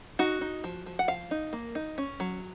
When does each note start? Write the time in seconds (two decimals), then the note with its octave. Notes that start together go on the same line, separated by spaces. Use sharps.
0.19 D#4 F#4
0.41 D#4
0.64 F3
0.86 F3
0.99 F#5
1.08 F3 F5
1.31 D#4
1.53 A#3
1.75 D#4
1.98 C#4
2.20 F#3